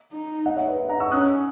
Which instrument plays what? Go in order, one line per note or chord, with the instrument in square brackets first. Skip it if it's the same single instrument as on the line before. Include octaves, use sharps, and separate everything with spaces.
[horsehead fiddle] D#4
[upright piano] D#5 F#5
C#5 E5
B4 D#5
F#5 A#5
C#6 E6
[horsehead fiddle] C#4 [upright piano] D#6 F#6